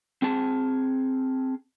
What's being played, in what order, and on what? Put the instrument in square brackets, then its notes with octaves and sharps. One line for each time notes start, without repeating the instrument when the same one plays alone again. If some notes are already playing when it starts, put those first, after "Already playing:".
[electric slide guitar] C4 G#4 A5